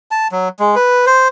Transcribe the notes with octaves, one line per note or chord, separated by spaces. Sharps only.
A5
F#3
G#3
B4
C5